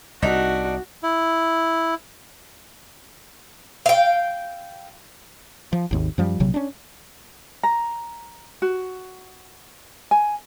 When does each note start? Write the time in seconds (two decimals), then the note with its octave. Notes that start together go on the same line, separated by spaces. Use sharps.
0.22 C2 D4 D#4 F#4 E5
1.03 E4
3.86 F5 G5
5.73 F3
5.91 G#1 D#2
6.18 F#2 F3 G3
6.40 A#1 C3 F#3
6.54 C#4 D4
7.63 A#5
8.62 F#4
10.11 G#5